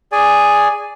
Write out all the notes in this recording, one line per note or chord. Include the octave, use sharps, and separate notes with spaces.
G#4 D5 G#5